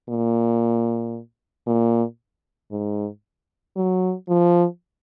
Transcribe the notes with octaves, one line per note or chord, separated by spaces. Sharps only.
A#2
A#2
G#2
F#3
F3